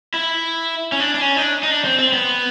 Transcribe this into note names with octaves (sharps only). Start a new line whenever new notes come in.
E4
C#4
D4
D4
C#4
D#4
D4
D#4
D4
C4
C4
B3